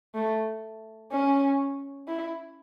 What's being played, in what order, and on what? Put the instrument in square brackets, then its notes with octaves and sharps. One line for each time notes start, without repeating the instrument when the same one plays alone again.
[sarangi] A3
C#4
E4